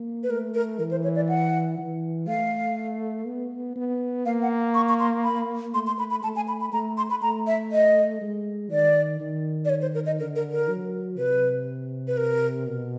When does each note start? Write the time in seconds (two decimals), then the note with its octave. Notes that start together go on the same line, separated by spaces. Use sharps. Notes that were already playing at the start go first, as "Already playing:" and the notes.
Already playing: A#3
0.23 B4
0.30 A3 A#4
0.54 A#4
0.79 E3 A#4
0.91 C5
1.04 C#5
1.16 D5
1.29 F#5
1.78 E3
2.27 A3 F5
3.27 B3
3.76 B3
4.26 A#3 F5
4.42 F#5
4.74 C#6
4.89 C#6
5.00 C6
5.24 B5
5.74 A3 C6
5.87 C6
5.99 B5
6.11 B5
6.23 A3 A5
6.36 G#5
6.48 B5
6.61 B5
6.73 A3 A#5
6.98 C6
7.11 B5
7.22 A3 A#5
7.47 E5
7.72 D#5
8.21 G#3
8.71 D#3 D5
9.20 D#3
9.65 D5
9.69 C#5
9.82 C5
9.94 A#4
10.06 D#5
10.19 D3 A#4
10.36 A#4
10.52 A#4
10.68 F#3
11.18 C3 B4
12.08 B4
12.17 A#4
12.67 B2